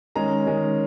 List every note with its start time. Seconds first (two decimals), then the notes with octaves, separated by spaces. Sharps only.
0.16 D#3 G#3 C#4 A#5
0.47 D#3 G#3 C#4